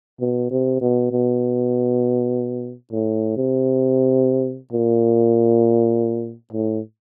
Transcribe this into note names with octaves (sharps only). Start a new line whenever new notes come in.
B2
C3
B2
B2
A2
C3
A#2
A2